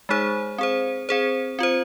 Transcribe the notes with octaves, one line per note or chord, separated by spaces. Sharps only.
G#3 D#4 G#4 C5
C4 G#4 C5
C4 G#4 C5
C4 F4 C5